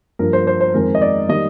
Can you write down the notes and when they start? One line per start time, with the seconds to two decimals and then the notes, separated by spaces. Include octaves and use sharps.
0.19 G2 F3 A#3 A#4
0.33 C5
0.47 C5
0.60 C5
0.74 F2 D#3 G#3 A#4
0.95 D#5
1.02 D5
1.28 D#3 G3 A#3 D#5